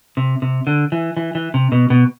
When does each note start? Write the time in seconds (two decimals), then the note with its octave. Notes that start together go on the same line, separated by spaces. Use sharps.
0.17 C3
0.42 C3
0.67 D3
0.92 E3
1.17 E3
1.35 E3
1.54 C3
1.72 B2
1.90 B2